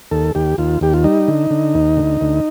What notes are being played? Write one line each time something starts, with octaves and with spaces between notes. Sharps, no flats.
D#2 A4
D#2 G4
D#2 F4
D#2 G4
F4
G3 D#4
D3
D3
D#2
D2
D2